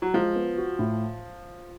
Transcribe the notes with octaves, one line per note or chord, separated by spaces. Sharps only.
F#3
F3 G#3
B3
F#4
A2